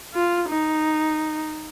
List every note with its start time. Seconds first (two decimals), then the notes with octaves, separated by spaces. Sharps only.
0.14 F4
0.49 D#4